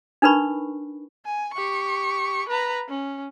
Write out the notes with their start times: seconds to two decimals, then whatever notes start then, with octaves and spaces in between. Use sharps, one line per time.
0.22 D4 D#4 A#4 B4 B5 C#6
1.25 G#5
1.54 G4 C#6
2.49 B4 A#5
2.88 C#4